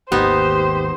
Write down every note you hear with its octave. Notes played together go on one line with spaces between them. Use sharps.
G#1 D#2 B3 D#4 G4 C5